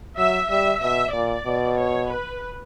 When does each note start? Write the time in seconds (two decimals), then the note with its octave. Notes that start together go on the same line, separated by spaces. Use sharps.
0.18 F#3 E5
0.50 G3 E5
0.82 B2 E5
1.13 A#2 D5
1.46 B2
1.77 C#5
2.09 B4